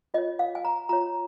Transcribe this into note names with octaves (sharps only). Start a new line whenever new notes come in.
F4 C#5 D#5
F5
G#5
A#5
F4 C#5 A#5